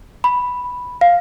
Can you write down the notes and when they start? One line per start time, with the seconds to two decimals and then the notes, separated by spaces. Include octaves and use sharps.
0.24 B5
1.01 F5